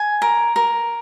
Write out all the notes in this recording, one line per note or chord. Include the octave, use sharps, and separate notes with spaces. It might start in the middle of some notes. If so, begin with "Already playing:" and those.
Already playing: G#5
A#4
A#4